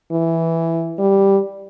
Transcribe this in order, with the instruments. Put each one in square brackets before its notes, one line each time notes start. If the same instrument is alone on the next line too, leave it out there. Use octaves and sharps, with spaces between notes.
[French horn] E3
G3